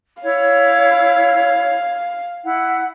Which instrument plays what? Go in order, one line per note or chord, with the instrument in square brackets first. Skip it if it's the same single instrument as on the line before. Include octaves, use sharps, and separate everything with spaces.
[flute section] E4 C#5 [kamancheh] F5
[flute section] E4 F#5